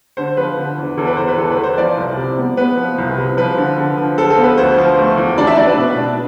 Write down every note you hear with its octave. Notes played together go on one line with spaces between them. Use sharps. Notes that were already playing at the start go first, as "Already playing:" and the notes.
D3 C5
F3 B4
D3
E2
E2 A4
B4
E2 C5
B4
E2 A4
B4
E2
C5
F3 D5
C2
C3
B3
B3 B4
F3
C2
C3
F3 B4
D3
D3
F3
F3 A4
A4
B3
B4
D2 C5
F3
A3
E2
D4 D5
E5
D4 D5
B4
B2
D4